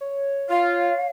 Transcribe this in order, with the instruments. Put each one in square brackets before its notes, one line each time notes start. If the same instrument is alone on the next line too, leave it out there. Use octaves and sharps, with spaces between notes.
[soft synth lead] C#5
[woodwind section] F4 [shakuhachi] F5